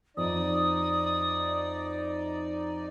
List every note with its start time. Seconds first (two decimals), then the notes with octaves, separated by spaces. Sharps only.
0.17 F2 D#4 D5 D#6